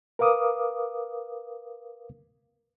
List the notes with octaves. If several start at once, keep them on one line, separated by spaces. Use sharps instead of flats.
A#4 B4 F5 D6 D#6